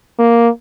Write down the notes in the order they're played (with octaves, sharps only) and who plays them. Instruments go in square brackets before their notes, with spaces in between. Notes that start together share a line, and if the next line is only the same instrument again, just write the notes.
[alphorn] A#3